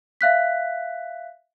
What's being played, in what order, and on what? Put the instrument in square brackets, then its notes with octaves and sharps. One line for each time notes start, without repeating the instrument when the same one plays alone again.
[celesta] E5 F5 F#6 B6